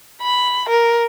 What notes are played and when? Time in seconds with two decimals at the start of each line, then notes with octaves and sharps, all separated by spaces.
0.22 B5
0.69 A#4